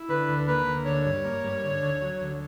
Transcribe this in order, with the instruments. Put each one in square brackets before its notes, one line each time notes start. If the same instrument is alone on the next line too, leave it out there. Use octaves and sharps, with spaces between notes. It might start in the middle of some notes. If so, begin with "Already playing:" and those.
Already playing: [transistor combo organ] E4
[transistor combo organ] D3 [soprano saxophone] B4
[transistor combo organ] D2
[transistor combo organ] A#3 [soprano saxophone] B4
[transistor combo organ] D2
[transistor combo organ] D3 [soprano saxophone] C#5
[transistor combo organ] G2
A#3
G2
D3
D2
F#3
D2